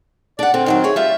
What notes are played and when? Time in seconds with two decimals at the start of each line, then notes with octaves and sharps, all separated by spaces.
0.39 D4 D5 F#5
0.54 D3 C4
0.66 D#3 E3 F#3
0.84 G#4 C#5 E5
0.96 G3 F4 E5